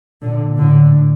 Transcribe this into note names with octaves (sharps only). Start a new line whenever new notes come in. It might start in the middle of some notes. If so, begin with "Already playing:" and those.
A#2 D3
A2 D3